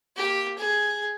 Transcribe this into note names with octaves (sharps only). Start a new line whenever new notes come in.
A#3 G4
G#4